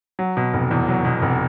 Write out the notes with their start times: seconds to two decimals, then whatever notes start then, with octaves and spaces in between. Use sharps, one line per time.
0.19 F#3
0.37 B2
0.53 F1
0.71 E2
0.88 F#3
1.05 B2
1.22 F1